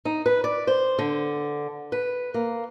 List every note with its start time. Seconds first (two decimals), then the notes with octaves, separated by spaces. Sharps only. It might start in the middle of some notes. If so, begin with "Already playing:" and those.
0.05 D#4
0.26 B4
0.44 D5
0.67 C5
0.99 D3
1.92 B4
2.34 A#3